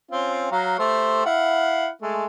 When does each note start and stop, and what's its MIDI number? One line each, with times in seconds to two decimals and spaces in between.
0.11 0.50 60
0.11 0.50 61
0.11 0.50 65
0.51 0.78 54
0.51 0.78 77
0.51 0.78 82
0.79 1.24 57
0.79 1.24 67
0.79 1.24 72
1.26 1.88 64
1.26 1.88 77
1.26 1.88 78
2.02 2.26 56
2.02 2.26 57